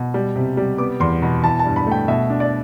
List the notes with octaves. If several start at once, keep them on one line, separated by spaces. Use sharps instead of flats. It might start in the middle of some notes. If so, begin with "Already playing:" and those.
Already playing: B2
G3
C3
G3
B3 D6
E2 C6
B2 B5
E3 A5
A5
G2
B5
A3
G5
B2 E5
D4
D5